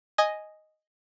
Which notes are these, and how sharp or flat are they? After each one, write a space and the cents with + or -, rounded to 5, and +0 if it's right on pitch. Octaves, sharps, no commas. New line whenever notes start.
D#5 +0 G#5 +0